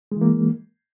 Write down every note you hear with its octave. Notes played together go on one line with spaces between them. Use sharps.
E3 G#3 A#3